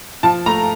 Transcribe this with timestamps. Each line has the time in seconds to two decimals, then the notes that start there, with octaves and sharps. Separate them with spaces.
0.23 F3 A5
0.46 A3 A#5